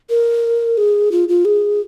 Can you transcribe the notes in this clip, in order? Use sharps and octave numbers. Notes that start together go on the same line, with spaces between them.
A#4
G#4
F4
F4
G#4